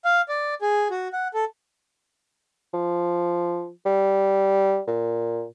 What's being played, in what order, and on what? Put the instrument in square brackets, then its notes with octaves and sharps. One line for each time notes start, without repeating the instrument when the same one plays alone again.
[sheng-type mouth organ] F5
D5
G#4
F#4
F#5
A4
[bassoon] F3
G3
A#2